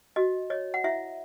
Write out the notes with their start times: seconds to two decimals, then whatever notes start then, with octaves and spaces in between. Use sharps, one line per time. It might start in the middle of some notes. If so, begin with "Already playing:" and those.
0.16 F#4 D#5
0.50 C#5 D#5
0.74 F#5
0.84 E4 E5